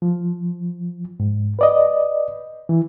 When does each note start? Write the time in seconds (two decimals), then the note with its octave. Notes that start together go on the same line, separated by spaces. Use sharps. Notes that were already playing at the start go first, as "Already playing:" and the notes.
0.02 F3
1.20 G#2
1.59 B4 D5 D#5
2.69 E3